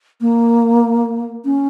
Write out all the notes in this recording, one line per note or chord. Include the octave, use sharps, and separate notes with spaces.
A#3
C#4